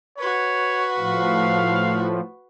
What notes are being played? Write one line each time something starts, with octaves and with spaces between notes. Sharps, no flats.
F#4 B4 C#5
A2 F3 F5